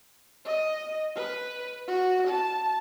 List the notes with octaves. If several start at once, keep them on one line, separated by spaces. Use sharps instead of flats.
D#5
B4
F#4
A5